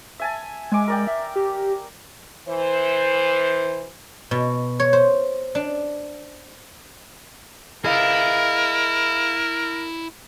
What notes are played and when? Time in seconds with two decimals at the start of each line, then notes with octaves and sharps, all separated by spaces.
0.20 E5 G#5 A5
0.72 G#3 G#5 D6
0.88 A#4 D5 G5
1.07 E5
1.36 G4
2.49 E3 C5
4.31 B2
4.80 C#5
4.93 C5
5.55 D4
7.84 E4 G#4 A#4 D#5 F5